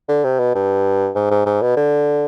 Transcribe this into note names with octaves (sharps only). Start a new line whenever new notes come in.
D3
C3
B2
G2
G#2
G#2
G#2
B2
D3